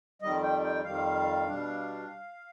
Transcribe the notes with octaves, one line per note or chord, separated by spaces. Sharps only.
F2 D#3 G3 D#5
G5
G5
F2 D#3 G3 F5
B2 G3 D4